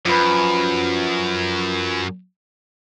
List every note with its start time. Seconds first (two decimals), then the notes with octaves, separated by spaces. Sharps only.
0.06 F#2 F3 B4